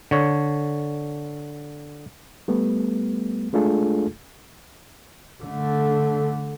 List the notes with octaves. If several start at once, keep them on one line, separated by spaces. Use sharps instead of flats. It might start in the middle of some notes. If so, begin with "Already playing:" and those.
D3 C#5
G3 A3 B3
G#3 A3 D4 F4 G#4 A4
D3 A3